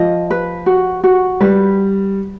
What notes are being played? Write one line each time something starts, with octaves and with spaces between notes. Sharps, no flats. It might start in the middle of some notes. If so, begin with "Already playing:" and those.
Already playing: F3 D#5
B4
F#4
F#4
G3 B4